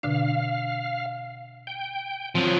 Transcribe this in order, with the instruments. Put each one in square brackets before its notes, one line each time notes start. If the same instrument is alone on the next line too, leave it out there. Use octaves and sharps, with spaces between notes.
[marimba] B2 D3 D4 [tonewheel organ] F5
[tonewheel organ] G5
[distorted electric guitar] F3 F#3 [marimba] C4